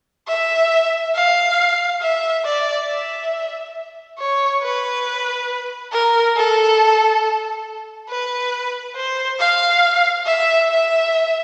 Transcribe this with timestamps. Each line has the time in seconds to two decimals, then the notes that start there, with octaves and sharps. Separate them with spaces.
0.28 E5
1.15 F5
2.02 E5
2.45 D5
2.89 E5
4.19 C#5
4.63 B4
5.92 A#4
6.36 A4
8.09 B4
8.97 C5
9.39 F5
10.26 E5
10.69 E5